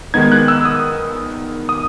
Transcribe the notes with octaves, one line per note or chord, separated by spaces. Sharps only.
D#3 G#3 B3 D#4 G#6
F#6
E6
D#6
D#6